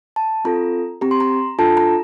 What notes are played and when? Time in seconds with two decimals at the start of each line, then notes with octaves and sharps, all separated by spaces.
0.16 A5
0.45 C4 F4 A4 A#5
1.01 C4 G4 A#5
1.11 C6
1.20 A#5
1.59 D4 F4 A4 A5
1.77 A#5